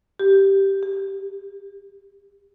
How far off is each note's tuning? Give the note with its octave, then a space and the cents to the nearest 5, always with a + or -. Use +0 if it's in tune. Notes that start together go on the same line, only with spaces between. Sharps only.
G4 -5
G4 +40